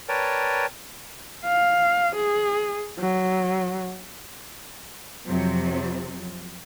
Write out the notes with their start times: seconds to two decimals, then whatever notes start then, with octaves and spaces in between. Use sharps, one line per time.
0.09 A#4 B4 C#5 D5 G5 A5
1.44 F5
2.16 G#4
2.99 F#3
5.26 F2 C3 F3 F#3 C4